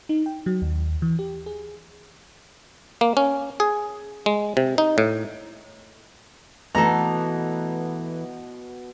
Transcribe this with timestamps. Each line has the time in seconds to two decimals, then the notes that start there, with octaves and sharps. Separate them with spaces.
0.09 D#4
0.26 G5
0.46 F#3
0.62 D#2
1.02 E3
1.19 G4
1.46 G#4
3.01 A#3
3.17 C#4
3.60 G#4
4.26 G#3
4.57 C3
4.78 D#4
4.98 A2
6.75 B2 E3 A3 B3 A4 A#5